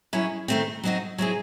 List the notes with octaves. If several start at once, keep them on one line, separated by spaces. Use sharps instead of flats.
F#3 C#4 E4 G#4
D#3 A3 C4
F#3 C4 D#4 F#4
F#3 C4 E4 G#4